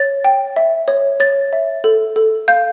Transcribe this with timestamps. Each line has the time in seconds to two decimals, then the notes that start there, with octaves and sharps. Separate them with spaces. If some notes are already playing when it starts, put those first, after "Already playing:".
Already playing: C#5 A6
0.24 G5
0.56 E5
0.88 C#5
1.20 C#5 A6
1.53 E5
1.84 A4
2.16 A4
2.48 F5 G6